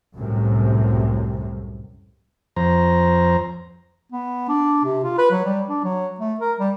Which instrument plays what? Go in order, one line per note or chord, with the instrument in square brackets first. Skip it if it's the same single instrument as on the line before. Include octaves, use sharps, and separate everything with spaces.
[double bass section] C2 F#2 A2 C3
[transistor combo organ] F2 C5 A#5
[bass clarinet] B3
D4
C3
F4
B4
F#3
G3
D4
F#3
A3
A#4
G3